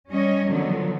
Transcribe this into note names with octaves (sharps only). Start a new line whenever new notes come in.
G3 C#4 C#5 D#5
D3 D#3 F3 F#3 B3